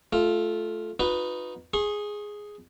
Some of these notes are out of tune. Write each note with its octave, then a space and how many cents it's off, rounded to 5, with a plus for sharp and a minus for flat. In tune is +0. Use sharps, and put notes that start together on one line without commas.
A3 -15 F4 +0
D#4 +0 F#4 -45 B4 +0
G#4 +0 C#6 -45